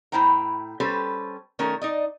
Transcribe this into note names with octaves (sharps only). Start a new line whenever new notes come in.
A2 E4 C5 G5 A#5
G3 C#4 G4 A4 B4 C5
D#3 A3 C#4 A#4
D#4 D5 D#5